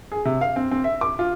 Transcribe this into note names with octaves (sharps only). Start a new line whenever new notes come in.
G#4
C3
F5
C4
C4
E5
D6
F4